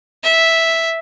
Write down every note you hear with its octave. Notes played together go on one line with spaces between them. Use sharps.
E5